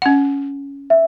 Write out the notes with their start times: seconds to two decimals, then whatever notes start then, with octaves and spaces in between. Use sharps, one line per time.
0.02 C#4 F#5
0.90 E5